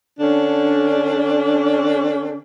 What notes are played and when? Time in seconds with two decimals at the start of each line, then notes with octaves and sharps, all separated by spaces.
0.19 D3 C#4 D4